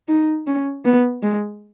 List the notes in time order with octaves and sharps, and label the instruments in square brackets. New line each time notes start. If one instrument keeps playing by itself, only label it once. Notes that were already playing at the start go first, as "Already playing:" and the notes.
[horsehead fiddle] D#4
C#4
B3
G#3